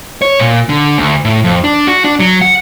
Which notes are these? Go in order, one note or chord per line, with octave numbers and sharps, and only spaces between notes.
C#5
A#2
D3
D2
A2
F2
D4
F#4
D4
F#3
F#5